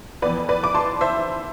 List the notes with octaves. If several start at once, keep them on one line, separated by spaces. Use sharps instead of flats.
F2 E3 B3 B4 D5
B4 D5
D6
A5 C6
C5 E5